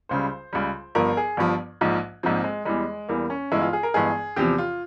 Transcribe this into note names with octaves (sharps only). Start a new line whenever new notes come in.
C#2 C#3 G3 C5
C#2 C#3 G3
G1 G2 F3 A#4
G#4
G1 G2 F3
A#1 G#2 F3
A#1 G#2 F3 C4
G#3
E2 E3 G3 G#3
E2 E3 G3 A#3
C#4
G1 G2 E3 G#3 E4
F4
G#4
A#4
G1 G2 E3 G#3 G#4
E2 C3 F3 G4
F4